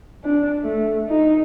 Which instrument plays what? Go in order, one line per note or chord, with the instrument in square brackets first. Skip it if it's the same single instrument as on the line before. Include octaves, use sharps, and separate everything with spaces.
[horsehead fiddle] D4
A3
D#4